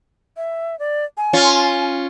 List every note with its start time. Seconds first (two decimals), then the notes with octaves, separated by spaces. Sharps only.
0.37 E5
0.79 D5
1.17 G#5
1.33 C#4 F4